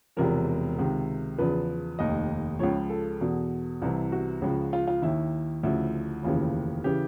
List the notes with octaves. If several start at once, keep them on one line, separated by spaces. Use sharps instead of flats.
E1 E2 C3 F3 A#4
C#2 C3 D#3
E2 C#3 F3 B4
F1 D#2 D#3 D#5
C#2 C#3 F3 C#5
A4
E2 B2
C2 C3 E3
F#4
C#2 C#3 F3
F4
F4
D#2 D#3 E4
D2 C#3 F3 E4
F1 D#2 C#3 E3 F4
C#3 E3 G4